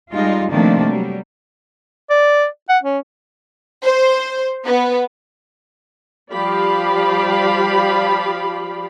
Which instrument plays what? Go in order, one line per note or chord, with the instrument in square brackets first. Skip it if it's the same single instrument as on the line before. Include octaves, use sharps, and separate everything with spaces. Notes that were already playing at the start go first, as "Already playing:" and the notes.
[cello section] G3 G#3 D#4 F4
C3 D#3 F3 A3 A#3 D4
F#3 G3
[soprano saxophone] D5
F#5
C#4
[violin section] C5
B3
[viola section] F3 G3 G4 D5 F5 B5